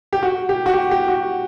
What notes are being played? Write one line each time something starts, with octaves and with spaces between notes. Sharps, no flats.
G4
F#4
G4
F#4
G4
G4
F#4